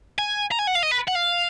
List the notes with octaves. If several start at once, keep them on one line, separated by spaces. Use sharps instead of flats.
G#5
A#5
G#5
F#5
F5
D#5
B4
F#5
F5